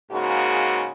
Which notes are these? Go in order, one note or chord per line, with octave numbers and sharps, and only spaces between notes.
G#2 C#3 A#3 F#4